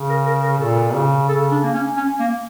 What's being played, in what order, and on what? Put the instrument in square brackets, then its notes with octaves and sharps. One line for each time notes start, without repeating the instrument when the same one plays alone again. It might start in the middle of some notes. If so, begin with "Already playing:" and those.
Already playing: [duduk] C#3
[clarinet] A#4
A#4
A#4
[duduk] A#2 [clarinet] A4
[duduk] C#3
[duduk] C#3 [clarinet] A4
[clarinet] D4
A#3
C#4
C#4
A#3